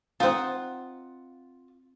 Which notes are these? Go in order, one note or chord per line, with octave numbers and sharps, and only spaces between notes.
C4 D#4 F4 F#5